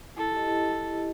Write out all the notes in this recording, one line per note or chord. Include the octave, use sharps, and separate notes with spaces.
E4 A4
G4 D#5
E4